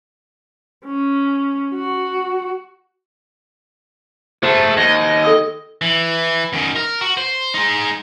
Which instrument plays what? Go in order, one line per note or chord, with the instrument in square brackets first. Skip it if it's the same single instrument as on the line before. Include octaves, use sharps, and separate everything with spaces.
[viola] C#4
F#4
[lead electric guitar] A3 [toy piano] F#4 C5 [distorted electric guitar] G#4 A5
[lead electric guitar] D#2 [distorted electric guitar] D#5
[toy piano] A4 D#6 E6
[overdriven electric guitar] E3
F#2 D#3
A#4
F#4
C5
G#3 D#4